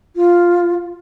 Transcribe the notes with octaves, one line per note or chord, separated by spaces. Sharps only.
F4